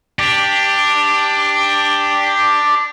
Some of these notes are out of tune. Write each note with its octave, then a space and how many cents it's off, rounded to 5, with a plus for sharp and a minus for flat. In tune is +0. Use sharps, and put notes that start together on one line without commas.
D4 +0 G4 +10